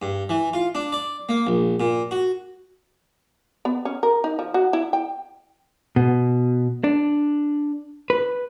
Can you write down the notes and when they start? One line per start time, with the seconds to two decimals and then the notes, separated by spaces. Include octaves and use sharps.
0.02 G2
0.29 E3
0.53 F4
0.75 D4
0.92 D5
1.29 A#3
1.47 A#1
1.80 A#2
2.11 F#4
3.65 B3
3.85 C#4
4.03 A#4
4.24 D#4
4.39 F3
4.54 F#4
4.73 E4
4.93 G5
5.96 B2
6.84 D4
8.10 B4